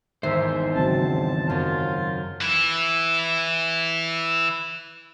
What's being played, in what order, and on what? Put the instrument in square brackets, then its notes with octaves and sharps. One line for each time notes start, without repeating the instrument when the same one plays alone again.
[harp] G#1 [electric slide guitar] E2 C5 [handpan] E5
[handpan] C#3 F#3 C4 [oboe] A5
[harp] F#2 [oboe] F4
[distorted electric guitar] E3 E4